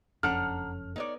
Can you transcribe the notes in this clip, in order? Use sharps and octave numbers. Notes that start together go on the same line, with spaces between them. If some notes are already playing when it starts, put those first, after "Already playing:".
F#1 F2 C#4 D4 A4 F#5 A#5 F6
B3 D#4 C#5 D5